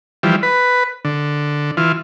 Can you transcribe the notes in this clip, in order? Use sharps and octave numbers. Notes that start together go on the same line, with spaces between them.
E3 F3 G3
B4
D3
E3 F4